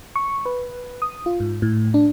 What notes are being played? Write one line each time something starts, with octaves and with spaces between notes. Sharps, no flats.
C#6
B4
D#6
F4
G#2
A2
D4